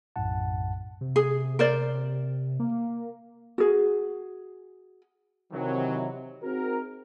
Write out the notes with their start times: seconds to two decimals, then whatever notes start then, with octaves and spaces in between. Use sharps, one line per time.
0.16 B1 F#2 A2 F#5 A5
1.01 C3
1.16 G#4
1.59 A#4 C5 D5
2.60 A#3
3.58 F#4 G#4
5.53 C3 D#3 E3 F#3
6.43 C4 D#4 F#4 G#4 A#4